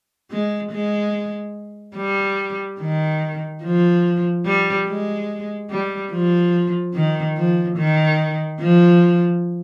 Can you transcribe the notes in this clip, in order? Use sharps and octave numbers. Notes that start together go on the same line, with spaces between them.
G#3
G#3
G3
D#3
F3
G3
G#3
G3
F3
D#3
F3
D#3
F3